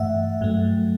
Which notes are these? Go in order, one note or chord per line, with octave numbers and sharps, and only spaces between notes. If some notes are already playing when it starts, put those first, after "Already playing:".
Already playing: G2 E3 A3 E5 F#5
G2 F#3 A3